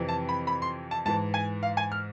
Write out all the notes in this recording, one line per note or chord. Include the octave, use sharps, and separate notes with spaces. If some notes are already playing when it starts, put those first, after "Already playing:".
Already playing: F2 C3 E3
A5
B5
B5
C6
A5
G#2 E3 A5
G#5
F5
G#5
F6